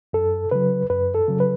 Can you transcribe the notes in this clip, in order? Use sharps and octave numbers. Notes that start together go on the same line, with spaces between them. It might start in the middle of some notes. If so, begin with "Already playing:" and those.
F#2 A4
C#3 F#3 B4
F#2 B4
A4
C#3 F#3
B4